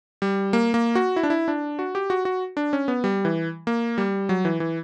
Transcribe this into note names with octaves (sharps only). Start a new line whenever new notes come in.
G3
A#3
A#3
F#4
E4
D4
E4
D4
F#4
G4
F#4
F#4
D4
C#4
B3
G3
E3
A#3
G3
F#3
E3
E3